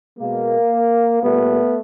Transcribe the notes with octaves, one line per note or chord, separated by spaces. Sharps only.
B2 G#3 A#3
A#2 G3 A3 B3